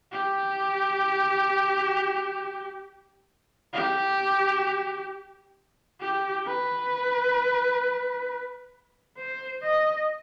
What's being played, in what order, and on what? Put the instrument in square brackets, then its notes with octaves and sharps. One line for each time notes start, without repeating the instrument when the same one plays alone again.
[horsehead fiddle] G4
G4
G4
B4
C5
D#5